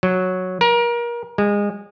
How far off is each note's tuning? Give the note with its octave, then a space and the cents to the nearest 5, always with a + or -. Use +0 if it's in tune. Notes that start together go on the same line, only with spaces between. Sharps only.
F#3 -5
A#4 +30
G#3 -25